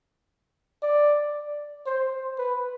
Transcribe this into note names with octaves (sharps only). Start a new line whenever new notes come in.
D5
C5
B4